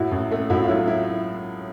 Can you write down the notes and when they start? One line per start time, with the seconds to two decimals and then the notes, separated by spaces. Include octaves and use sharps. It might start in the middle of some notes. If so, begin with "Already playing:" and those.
Already playing: A2 E4 F#4
0.11 A1
0.31 A3
0.50 A2 E4 F#4
0.63 F4
0.68 F#3 E4
0.88 E4